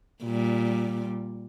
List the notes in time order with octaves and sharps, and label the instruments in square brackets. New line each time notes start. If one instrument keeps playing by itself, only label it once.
[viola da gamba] A#2 G3